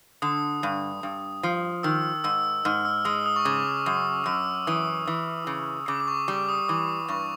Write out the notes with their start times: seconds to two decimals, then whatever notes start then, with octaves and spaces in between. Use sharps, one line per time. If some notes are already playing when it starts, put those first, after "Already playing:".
0.22 D3 D#6
0.63 G2
1.03 G2
1.43 F3
1.83 D#3 E6
2.24 G#2 E6
2.65 G#2 F6
2.85 E6
3.05 G#3 D#6
3.26 D#6
3.36 C#6
3.45 C#3 D6
3.86 F#2 D#6
4.26 F#2 E6
4.67 E3 D#6
5.07 E3
5.47 C#3
5.88 C#3 D6
6.00 D6
6.08 C#6
6.28 G3 D6
6.49 D#6
6.68 E3 D6
7.08 G2 C#6